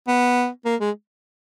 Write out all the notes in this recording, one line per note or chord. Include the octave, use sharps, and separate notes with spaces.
B3
A#3
G#3